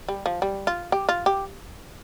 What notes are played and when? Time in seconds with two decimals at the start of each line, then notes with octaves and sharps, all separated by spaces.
0.08 G3
0.26 F3
0.42 G3
0.67 F4
0.92 G4
1.09 F4
1.26 G4